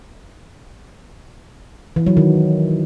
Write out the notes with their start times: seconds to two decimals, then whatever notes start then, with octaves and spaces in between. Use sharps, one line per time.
1.96 E3
2.07 F#3
2.17 D#3